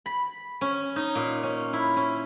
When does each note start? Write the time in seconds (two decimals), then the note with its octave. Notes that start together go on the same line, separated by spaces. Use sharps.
0.06 B5
0.61 C#4
0.96 D#4
1.15 A#2
1.43 C#4
1.73 E4
1.96 C#4